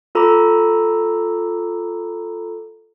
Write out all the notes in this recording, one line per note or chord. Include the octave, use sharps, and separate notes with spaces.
F4 A4 A#5 B5 D6